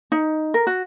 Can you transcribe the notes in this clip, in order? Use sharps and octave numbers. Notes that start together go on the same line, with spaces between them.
D#4
A#4
F#4